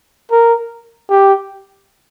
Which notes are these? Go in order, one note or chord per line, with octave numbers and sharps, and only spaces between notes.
A#4
G4